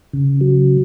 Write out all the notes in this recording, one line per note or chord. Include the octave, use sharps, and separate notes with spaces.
C#3
F#3